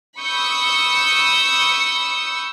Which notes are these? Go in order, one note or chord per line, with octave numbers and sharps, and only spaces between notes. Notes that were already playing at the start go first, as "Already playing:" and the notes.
B5 C#6 D#6 E6 G6 C#7